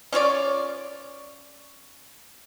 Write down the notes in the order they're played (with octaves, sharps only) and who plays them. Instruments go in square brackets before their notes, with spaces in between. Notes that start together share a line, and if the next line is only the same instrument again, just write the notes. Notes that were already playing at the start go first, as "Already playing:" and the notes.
[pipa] C#4 F4 C#5 D5